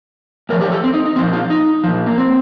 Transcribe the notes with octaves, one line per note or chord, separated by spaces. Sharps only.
A2 F3 A#4
G4
A4
C4
D#4
D#4
A#2 F3 C4
F4
D#4
A#2 F3
A#3
C4